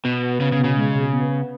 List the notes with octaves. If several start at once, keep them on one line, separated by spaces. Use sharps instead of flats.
B2 B3
B3
C#3 B3
C#3
B2
C#3
G#3
B2
B3
B3